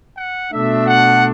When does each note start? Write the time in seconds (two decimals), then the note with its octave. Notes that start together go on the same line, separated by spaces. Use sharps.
0.17 F#5
0.52 B2 A3 D4 E5
0.87 F#5